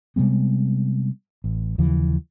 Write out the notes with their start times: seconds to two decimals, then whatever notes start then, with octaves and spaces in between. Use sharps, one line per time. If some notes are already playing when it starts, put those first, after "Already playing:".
0.16 C3 G3 G#3 B3
1.44 A1
1.78 D#2 C#3 E3 F3